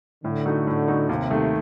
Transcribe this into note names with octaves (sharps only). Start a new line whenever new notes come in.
A2 D3
A3 D#4 F#4
A2
A3 D#4 F#4
D#2 C3
D#3 A3